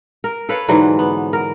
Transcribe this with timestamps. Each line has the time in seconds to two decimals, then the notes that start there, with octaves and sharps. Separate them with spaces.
0.24 A#4
0.49 A4 B4 C#5 F5
0.68 G#2 D3 E3 F#3
0.99 B3
1.33 A#4